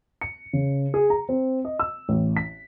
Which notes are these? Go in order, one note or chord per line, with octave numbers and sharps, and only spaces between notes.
C#7
C#3
G#4
A#5
C4
D#5
E6
A1
B6